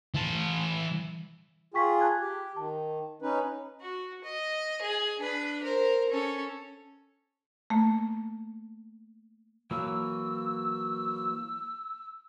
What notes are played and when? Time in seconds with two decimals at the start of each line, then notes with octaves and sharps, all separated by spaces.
0.14 E3 A5
1.74 F4 G#4 G5 C#6 B6
2.01 A5 F#6 G#6
2.19 G4
2.56 D#3 A5
3.22 C#4 D#4 B4
3.81 F#4
4.24 D#5
4.82 G#4
5.19 D4 B4
5.63 A#4 C5
6.10 C#4 A4
7.70 A3 A#3
9.71 E3 F#3 A#3 E6